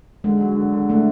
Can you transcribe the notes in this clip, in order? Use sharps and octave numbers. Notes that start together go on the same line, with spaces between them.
D3 G#3
F#3
D3
D3
D3 A3